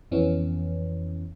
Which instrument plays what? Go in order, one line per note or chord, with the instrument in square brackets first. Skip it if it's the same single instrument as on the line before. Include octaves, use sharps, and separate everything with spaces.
[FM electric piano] F2 E3 B3 C#4